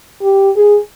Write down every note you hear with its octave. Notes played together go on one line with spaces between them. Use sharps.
G4
G#4